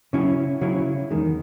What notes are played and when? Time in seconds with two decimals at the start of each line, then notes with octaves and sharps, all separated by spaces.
0.13 C#3 F#3 C#4 E4
0.61 C#3 F#3 C#4 E4
1.10 E2 D#3 G#3